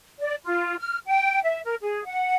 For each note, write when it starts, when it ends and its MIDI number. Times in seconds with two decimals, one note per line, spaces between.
0.20 0.35 74
0.44 0.79 65
0.79 0.98 89
1.07 1.43 79
1.43 1.61 76
1.66 1.75 70
1.82 2.05 68
2.06 2.36 78